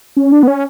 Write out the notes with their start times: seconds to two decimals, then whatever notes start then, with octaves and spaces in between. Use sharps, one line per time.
0.17 C#4
0.32 D4
0.43 B3
0.48 C#4